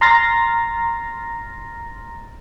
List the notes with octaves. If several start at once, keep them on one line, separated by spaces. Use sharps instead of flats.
A#5 C6 F6 A6 A#6